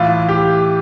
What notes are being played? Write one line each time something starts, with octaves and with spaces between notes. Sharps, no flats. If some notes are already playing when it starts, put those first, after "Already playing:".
Already playing: A2 E3 F4
G4